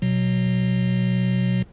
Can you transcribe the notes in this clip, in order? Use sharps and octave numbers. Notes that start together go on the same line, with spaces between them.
B2 F#3